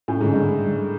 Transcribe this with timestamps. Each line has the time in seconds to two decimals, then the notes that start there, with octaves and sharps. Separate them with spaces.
0.08 A2 C#4
0.21 G#2 D3
0.34 G2
0.42 G3